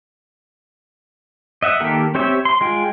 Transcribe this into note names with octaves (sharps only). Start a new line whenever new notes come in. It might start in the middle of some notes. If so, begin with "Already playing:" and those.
D#5 E5 F#5
D#3 A#3 G4 A4 A#4
C4 G4 C#5 E5 G5
C6
G#3 F4 G5